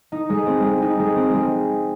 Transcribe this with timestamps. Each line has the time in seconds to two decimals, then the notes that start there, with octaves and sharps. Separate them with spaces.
0.12 D#4
0.30 G#3
0.47 C4
0.64 G#3
0.82 D#4
0.99 G#3
1.16 C4
1.34 G#3